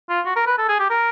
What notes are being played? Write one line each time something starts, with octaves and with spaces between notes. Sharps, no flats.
F4
F#4
A#4
B4
A4
G#4
G4
A#4